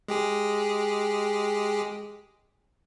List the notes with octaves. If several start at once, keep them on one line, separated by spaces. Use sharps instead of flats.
G#3 G4 G#4